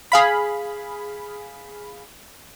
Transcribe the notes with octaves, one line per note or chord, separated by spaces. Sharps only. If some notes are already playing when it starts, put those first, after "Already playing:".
G#4 F5 B5